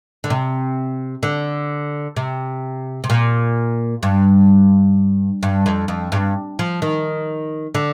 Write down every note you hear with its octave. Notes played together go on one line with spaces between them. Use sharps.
D3
C3
D3
C3
C3
A#2
G2
G2
F2
F2
G2
F3
D#3
D3